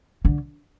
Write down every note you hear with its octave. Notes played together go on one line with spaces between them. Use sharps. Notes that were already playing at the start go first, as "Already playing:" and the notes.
D3